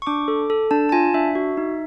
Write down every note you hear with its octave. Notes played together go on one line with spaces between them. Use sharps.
C#6
D4 D6
A4
A4
D4 A5
A5
F4 G#5
D4 E5
F#4
D#4